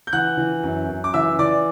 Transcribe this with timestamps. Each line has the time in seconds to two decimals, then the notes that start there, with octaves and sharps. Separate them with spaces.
0.07 G6
0.13 E3 F#5 F#6
0.37 E3
0.63 F#2
0.89 F#2
1.04 D6
1.14 E3 E5 E6
1.39 E3 D5 D6